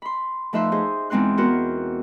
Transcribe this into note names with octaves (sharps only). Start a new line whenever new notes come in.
B5 C6
F3 A3 D#4 B4 E5 C6
D#4 G#4 C5
E2 G#3 C4 D#4 C6 F#6
B3 F#4 A#4 C5